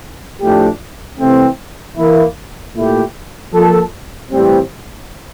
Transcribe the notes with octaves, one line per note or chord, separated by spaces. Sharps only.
A2 F3 A3 D4 G4
C3 E3 A3 C4
E3 A#3 E4
A#2 A3 E4 G4
F3 A#3 F4 A4
A2 E3 G3 C4